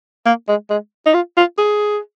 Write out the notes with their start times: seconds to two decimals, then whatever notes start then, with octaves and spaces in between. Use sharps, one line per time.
0.26 A#3
0.48 G#3
0.70 G#3
1.06 D#4
1.14 F4
1.37 F4
1.58 G#4